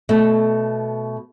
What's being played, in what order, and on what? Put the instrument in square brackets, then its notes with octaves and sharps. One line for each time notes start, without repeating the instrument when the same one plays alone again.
[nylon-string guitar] B2 A3